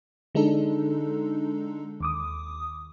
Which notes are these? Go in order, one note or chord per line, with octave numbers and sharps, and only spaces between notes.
D3 G#3 D4 D#4 A4
D#2 D6 D#6